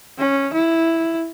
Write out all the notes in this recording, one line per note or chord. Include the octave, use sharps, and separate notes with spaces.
C#4
E4